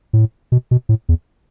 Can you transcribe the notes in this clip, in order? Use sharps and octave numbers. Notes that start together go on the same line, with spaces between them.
A2
B2
B2
A2
E2